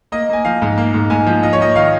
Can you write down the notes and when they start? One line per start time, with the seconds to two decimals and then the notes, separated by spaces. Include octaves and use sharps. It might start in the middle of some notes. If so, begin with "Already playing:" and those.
0.12 A#3 D#5
0.29 A#3 G#5
0.45 F3 F5
0.62 G#2
0.78 A#3
0.94 G#2
1.10 G#2 G#5
1.27 F3
1.43 F4 D#5
1.53 C#5
1.60 A#3 D#5
1.76 D#3 F5